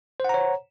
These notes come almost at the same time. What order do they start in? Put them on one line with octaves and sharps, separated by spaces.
C5 F#5 A#5 C#5